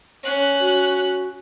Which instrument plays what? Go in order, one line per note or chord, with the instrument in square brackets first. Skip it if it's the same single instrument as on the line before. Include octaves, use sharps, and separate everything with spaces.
[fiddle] C#4 F#6
[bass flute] F#4